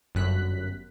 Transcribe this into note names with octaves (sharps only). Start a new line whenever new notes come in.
G1 F#2 F#6 B6